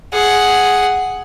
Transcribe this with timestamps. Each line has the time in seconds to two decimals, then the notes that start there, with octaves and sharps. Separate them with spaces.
0.14 G#4 F#5